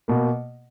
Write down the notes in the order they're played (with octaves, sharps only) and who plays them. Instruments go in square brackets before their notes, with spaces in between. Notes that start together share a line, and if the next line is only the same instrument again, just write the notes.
[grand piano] B2 A#3